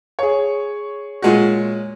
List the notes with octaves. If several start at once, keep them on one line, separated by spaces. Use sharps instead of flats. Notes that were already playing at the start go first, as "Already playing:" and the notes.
G#4 C#5
A#2 G#3 F#4